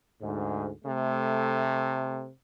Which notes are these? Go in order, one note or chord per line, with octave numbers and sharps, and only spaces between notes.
D2 G#2
C3 A3